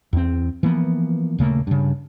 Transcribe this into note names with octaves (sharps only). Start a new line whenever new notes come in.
E2 C4
E3 F3 A#3 B3
D#1 C#3 A3 A#3
G2 C#3